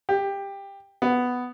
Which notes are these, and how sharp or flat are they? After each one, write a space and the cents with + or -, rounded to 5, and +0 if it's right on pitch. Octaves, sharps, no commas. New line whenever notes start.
G4 +15
B3 +5